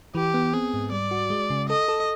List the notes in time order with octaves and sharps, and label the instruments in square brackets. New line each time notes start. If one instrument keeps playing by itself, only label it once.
[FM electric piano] E3 [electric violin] G4
[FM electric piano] B3
[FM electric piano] C4 [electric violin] G#4
[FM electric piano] G#2
[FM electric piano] G3 [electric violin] D5
[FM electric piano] F#4
G#3
C#3
[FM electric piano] A4 [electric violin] D#5
[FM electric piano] A4